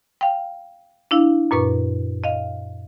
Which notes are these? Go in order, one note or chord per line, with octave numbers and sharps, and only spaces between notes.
F5 G5
D4 E4 F5
F#2 A#2 B4 C#6
D#5 F5